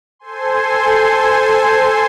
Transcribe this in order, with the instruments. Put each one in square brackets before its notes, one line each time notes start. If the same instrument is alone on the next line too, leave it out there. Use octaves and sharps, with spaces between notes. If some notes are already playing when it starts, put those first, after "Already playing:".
[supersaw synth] A4 C5 G#5 C6